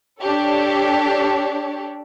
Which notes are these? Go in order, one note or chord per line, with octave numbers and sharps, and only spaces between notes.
D4 G4 A4 C#5